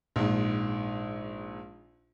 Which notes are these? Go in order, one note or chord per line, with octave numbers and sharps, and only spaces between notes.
A#1 G#2